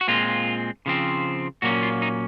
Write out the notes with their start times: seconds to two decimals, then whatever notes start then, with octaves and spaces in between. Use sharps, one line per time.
0.01 F#4
0.08 A#2 G#3 C4 F4
0.86 C#3 F3 C4
1.62 A#2 F#3 A#3 C#4 F#4
1.83 F4
2.02 D#4